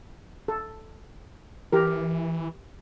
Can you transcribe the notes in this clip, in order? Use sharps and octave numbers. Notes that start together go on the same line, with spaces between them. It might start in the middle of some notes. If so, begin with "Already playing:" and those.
A4
E3 G4 A#4